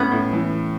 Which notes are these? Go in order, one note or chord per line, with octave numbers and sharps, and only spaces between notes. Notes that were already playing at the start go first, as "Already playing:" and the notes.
Already playing: A2 B3 C#4
A2
E3